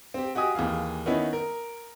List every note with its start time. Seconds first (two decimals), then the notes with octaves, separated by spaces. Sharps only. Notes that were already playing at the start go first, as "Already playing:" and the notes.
0.14 C4 G4
0.35 F#4 G4 D#5 G#5 D#6
0.55 D#2 E3 G#4 F5
1.06 D#3 B3 C#4 D#4 E4
1.33 A#4